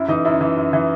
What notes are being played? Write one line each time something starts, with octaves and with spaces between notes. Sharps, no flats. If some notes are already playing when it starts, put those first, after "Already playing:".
Already playing: F#2 E4
E3 D#4
F#2 E4
E3
F#2
E3